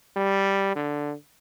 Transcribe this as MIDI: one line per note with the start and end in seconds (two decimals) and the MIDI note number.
0.16 0.74 55
0.76 1.14 50